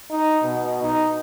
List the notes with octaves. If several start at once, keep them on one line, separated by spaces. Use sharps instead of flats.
D#4
B2
D#4